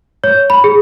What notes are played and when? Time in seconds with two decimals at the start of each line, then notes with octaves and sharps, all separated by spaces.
0.24 C#5
0.50 B5
0.64 G#4